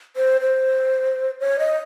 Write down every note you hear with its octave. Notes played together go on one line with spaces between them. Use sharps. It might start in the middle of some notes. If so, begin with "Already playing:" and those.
C5
C5
C#5
D#5